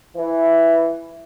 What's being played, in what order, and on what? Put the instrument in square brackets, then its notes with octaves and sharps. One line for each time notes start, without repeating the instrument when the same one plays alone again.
[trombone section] E3